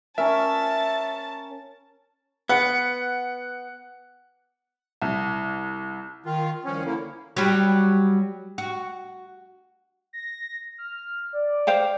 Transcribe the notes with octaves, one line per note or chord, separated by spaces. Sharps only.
C#4 A#4 E5 A5
B3 F#5
C2
D#3 F4
C2 D#3 F3 C#4 F5
D3 A#3 E4
F#3 G3
F#4
A#6
F6
D5
C5 F5 G5